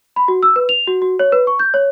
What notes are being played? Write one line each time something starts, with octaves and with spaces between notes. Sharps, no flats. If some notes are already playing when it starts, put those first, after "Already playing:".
B5
F#4
E6
B4
F7
F#4
F#4
C#5
B4
C#6
G6
C#5